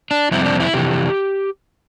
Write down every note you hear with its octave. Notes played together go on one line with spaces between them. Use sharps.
D4
F2 C3 G3 C4 E4
D4
E4
F2 C3 E3 G4